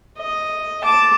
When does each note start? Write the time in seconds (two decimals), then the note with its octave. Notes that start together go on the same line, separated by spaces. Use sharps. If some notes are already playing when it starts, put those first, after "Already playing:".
0.19 D#5
0.84 A5 D6